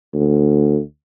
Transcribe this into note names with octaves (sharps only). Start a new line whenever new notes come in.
D2